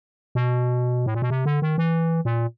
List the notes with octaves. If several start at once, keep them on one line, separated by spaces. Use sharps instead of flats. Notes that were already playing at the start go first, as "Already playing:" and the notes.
B2
A2
A#2
B2
C3
D3
D#3
E3
A#2